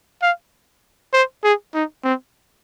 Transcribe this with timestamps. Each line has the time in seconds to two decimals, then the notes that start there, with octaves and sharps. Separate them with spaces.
0.22 F5
1.13 C5
1.44 G#4
1.75 D#4
2.04 C4